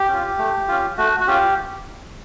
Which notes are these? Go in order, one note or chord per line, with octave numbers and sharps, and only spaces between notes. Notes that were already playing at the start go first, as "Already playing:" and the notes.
Already playing: G4
C#4 F4
A3
C#4 F4
A3 F#4
F#4
C#4 F4 G4